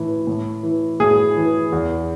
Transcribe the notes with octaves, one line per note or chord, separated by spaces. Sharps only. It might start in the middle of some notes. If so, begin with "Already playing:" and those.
Already playing: A2 E3
A2
E3
A2 G#4
E3
E2